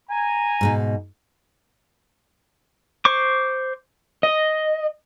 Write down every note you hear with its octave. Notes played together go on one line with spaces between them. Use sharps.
G#5 A#5
G#2 B2 D#4
C5 C#6 D6
D#5